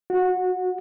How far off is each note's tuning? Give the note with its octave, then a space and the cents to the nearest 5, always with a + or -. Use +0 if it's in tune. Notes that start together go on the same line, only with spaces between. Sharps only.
F#4 -25